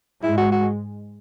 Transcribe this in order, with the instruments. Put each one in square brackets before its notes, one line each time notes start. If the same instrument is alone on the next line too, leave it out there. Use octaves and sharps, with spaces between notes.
[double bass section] G#2 G#3 [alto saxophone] E4
[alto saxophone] F#4
F#4